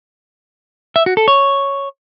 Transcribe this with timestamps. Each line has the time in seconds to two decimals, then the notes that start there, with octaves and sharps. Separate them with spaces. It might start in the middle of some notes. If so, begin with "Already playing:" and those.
0.96 E5
1.06 F#4
1.17 A4
1.28 C#5